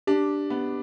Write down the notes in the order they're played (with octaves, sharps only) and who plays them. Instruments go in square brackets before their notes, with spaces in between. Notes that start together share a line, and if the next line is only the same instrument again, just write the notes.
[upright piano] D4 [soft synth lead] G4
[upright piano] B3